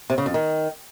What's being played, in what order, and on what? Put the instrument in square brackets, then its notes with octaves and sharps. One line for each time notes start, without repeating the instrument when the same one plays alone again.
[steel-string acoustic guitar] C3
C#3
F2
D#3